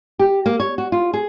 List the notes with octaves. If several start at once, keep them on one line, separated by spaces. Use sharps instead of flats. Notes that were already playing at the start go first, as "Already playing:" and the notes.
G4
A#3
C#5
F#4
F4
G#4